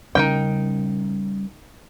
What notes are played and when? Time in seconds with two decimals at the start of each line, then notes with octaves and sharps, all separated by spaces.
0.15 C#3 G3 C#4 D#4 A#4 G5